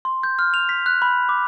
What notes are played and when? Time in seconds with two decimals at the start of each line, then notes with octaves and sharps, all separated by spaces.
0.05 C6
0.23 G6
0.39 F6
0.54 F7
0.69 B6
0.86 F#6
1.02 B5
1.29 D6